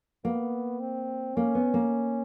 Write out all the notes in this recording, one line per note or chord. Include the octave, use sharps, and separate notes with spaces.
A#3 B3
C4
A#3 C#4
B3
A#3